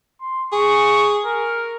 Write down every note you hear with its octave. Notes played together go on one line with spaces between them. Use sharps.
C6
G#4 C#6
A#4